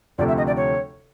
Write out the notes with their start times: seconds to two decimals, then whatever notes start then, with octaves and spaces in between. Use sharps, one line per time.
0.18 D2 C3 F3 A3 D5
0.28 E5
0.38 D#5
0.47 D5
0.57 C#5